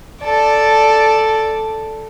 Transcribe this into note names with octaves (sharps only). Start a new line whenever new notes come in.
A4 D5